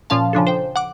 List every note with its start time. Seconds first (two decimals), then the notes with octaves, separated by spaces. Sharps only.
0.10 A#2 F3 C#4 F5 A5
0.33 C#3 F3 D4 A4
0.47 C5 G5
0.76 F#5 D6